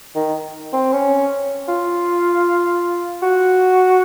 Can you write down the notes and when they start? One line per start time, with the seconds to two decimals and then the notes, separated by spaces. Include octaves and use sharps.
0.16 D#3
0.73 C4
0.93 C#4
1.68 F4
3.23 F#4